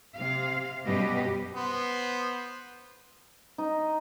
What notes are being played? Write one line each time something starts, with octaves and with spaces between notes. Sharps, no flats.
C3 F5
F#2 B2 G3 G4 B4 D#5
B3 C5
D#4